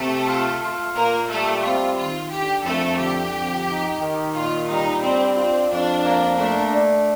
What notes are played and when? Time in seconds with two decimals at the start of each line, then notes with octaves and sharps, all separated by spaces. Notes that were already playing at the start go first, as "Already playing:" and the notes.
Already playing: C3 A3 A4
0.27 F4
0.61 F4
0.95 A#2 A#3 A#4
1.29 G3 A3 A4
1.63 C4 F4
1.96 D#3 F4
2.30 D3 G4
2.64 F2 A3 A4
2.98 D3 G4
3.33 F2
3.66 D#4
4.00 D#3
4.34 A#2 F4
4.68 G3 D#4
5.01 C4 D4
5.35 C4 F4
5.70 F2 D4
6.03 A#3
6.37 A3 D4
6.72 D4